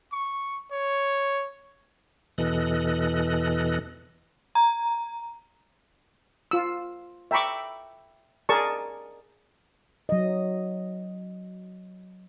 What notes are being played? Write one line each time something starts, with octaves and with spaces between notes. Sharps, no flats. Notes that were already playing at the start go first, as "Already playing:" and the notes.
C#6
C#5
E2 B2 E3 A4 D#5 F#6
A#5
F4 E6
E5 G5 A#5 B5 C#6 D6
G#4 A#4 D5 A5 C#6
F#3 D#5